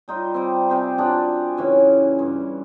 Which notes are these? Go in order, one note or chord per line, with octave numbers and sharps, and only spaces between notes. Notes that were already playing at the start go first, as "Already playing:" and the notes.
G3 D#4 F4
G3 C4
C3 G4 G#4 C6
D4 F4 F#4 G#4
C#3 E3 C#4
G2